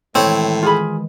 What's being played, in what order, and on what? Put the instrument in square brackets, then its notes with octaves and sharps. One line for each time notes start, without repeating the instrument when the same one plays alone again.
[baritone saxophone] A2 [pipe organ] D#3 E3 G#3 [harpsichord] C4 [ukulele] C#5
[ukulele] F4 G#4 B5